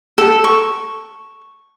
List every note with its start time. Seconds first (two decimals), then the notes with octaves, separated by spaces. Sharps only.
0.18 A4
0.44 C#6